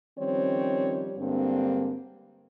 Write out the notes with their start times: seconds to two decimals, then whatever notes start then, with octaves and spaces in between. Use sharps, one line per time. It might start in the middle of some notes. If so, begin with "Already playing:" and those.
0.18 D#3 F3 G3 C4 C#4 C#5
1.17 G2 D3 G#3 A#3 C4